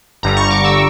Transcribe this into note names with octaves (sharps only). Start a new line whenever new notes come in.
G1 G2 D3 G3 A#5
C#6
D6
E6